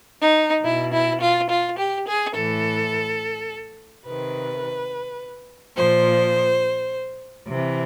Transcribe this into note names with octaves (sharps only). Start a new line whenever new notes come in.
D#4
B2 E4
E4
F4
F4
G4
G#4
A2 E3 A4
C3 D#3 B4
A#2 F3 C5
C3 E3